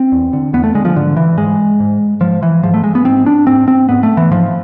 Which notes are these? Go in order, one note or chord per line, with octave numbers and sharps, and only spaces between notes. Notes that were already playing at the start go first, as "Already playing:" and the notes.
Already playing: C4
E2
D3
E2 B3
A3
D3 G#3
F3
G#2 D3
E3
G#2 G#3
G#2
G#2 F3
E3
G#2 F3
A3
G#3
B3
G#2 C4
D4
G#2 C4
C4
G#2 B3
A3
E3
G#2 F3